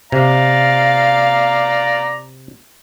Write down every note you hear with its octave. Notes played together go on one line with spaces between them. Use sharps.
C3 D5 F5 A#5